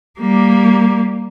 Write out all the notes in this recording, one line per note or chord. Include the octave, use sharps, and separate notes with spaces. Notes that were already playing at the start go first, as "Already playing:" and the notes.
G3 A#3